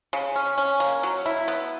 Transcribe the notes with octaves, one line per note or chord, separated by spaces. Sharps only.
C#3
C#4
C#4
A#3
F#3
E4
B3